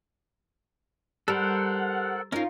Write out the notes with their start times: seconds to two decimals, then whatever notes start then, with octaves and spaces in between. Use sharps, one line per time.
1.28 G3 A4 A#4 C5 F#5
2.32 C#4 D#4 F4 A#4